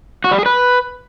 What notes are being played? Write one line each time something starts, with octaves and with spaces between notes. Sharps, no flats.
F#4
G3
G#4
B4